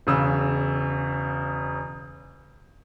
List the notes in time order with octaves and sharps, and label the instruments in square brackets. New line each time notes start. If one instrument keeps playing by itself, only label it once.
[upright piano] E1 C#3 E6